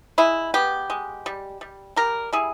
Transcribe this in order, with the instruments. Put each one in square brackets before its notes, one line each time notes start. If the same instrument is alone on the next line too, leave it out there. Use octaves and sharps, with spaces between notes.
[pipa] G#3 E4
B3 G4
G#3
G3
G3
G3 G4 A#4
G3 E4 G#4